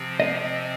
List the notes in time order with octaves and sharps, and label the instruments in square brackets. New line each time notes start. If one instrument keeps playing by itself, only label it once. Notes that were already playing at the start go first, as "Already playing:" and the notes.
Already playing: [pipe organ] C3 F3 C4
[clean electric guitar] D#5